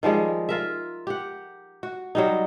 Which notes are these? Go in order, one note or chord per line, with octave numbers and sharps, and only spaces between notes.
D#3 F3 G3 G#3
F4 A#4 E5
G4 F#5
F#4
F#3 G3 D#4